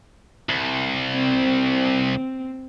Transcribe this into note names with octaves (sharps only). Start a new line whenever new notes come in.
C2
C4